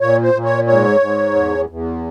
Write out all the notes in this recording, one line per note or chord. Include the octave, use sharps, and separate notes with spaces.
A#2 C#5
C5
A#2
C#5
G#2 C#5
G#2
E2
E2